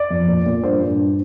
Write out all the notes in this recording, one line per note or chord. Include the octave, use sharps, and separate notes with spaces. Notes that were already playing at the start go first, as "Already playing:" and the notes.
Already playing: D5
F2
A#2
A#2
G2 C5
G2